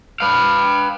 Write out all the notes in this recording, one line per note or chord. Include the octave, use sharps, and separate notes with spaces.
B4 F5